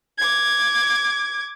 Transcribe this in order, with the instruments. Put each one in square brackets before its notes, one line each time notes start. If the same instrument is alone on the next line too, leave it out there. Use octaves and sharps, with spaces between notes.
[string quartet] D6 G#6